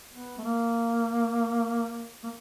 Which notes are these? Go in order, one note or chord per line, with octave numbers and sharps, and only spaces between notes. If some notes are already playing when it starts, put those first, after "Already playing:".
B3
A3
A#3
A#3